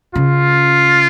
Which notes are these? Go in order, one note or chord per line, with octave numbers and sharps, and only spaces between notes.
C#3 F4